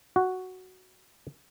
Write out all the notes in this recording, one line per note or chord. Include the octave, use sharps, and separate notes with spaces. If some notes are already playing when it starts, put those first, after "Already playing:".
F#4